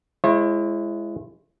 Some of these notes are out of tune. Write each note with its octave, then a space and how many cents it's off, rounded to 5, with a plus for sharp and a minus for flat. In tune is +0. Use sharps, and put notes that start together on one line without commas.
G#3 +10 E4 +30 C#5 -45